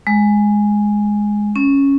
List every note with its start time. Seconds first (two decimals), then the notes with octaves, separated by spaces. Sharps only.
0.07 G#3
1.56 C#4